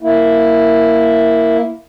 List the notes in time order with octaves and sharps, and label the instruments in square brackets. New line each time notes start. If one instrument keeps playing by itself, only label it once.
[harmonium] A#3 E4